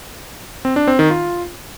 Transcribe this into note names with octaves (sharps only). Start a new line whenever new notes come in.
C4
D4
C4
D#3
F4